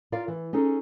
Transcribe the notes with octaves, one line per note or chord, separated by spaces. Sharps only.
F4 A#4 D5 F5
E3
C#4 D#4 G#4 A4